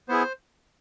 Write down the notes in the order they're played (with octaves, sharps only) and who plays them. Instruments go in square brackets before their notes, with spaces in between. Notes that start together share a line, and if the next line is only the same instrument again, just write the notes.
[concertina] B3 E4 G#4 C5